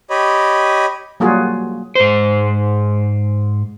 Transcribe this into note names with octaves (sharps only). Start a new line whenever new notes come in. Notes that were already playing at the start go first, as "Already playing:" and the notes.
G4 C#5 D#5 B5
F#3 G3 A#3 F4 F#4 G#4
G#2 C5